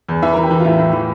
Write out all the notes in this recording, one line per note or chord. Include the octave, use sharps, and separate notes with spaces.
E2
E3 E5
E3 A#4
G4
E3
F4
A2 E4
A2
E3